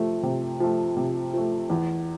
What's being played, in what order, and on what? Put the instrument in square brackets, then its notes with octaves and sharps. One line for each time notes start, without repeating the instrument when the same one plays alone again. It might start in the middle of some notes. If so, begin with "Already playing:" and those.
Already playing: [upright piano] C3 F3 A3
C3
F3 A3
C3
F3 A3
E2